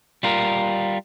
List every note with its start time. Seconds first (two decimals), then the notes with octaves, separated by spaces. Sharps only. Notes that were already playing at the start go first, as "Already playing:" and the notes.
0.23 G3 F4 A#4